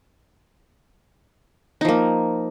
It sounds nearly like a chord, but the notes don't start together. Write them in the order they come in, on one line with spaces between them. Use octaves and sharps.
D#4 F3 A#3